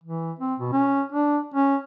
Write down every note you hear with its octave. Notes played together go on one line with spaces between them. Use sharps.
E3
C4
B2
C#4
D4
C#4